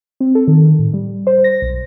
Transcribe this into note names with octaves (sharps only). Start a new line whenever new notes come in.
C4
A4
D#3
A2
G3
C5
A#6
B1